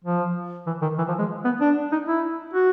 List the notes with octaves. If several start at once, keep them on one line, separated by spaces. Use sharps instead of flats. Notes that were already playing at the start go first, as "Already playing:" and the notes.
F3
E3
D#3
E3
F3
G#3
B3
D4
D#4
E4
F#4